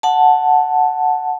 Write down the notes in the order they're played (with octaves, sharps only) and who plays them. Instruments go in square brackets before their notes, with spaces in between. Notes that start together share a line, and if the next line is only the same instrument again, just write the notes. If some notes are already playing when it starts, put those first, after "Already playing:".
[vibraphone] F#5 A5